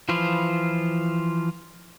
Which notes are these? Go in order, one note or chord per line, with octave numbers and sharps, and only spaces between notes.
E3 F3 F4 B5